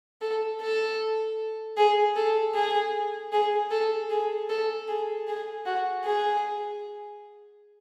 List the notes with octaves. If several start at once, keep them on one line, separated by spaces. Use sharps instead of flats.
A4
A4
G#4
A4
G#4
G#4
A4
G#4
A4
G#4
G#4
F#4
G#4